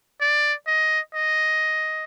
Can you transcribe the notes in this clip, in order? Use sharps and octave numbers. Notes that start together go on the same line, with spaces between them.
D5
D#5
D#5